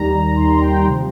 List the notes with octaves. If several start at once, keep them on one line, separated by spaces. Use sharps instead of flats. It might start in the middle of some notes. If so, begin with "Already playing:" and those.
Already playing: D#2 D#3 G3 A#5
D#2 D#3 G3 C6
A#5
G5
A#5
C3 F3